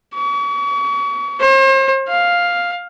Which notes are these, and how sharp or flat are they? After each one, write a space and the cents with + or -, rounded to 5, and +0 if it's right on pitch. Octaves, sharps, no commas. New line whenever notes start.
C#6 +40
C5 +40
F5 +5